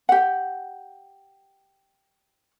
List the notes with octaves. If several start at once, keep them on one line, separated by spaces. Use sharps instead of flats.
G4 F#5